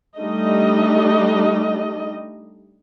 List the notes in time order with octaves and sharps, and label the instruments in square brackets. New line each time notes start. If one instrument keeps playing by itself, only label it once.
[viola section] G3 A3 D4 D#4 D#5